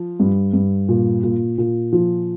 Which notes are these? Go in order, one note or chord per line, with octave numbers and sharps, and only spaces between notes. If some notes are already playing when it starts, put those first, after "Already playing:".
Already playing: F3
G2
G2
A#2
A#2
A#2
F3